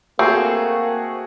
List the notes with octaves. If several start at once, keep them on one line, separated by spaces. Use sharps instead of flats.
A3 A#3 C4 F#4 G#4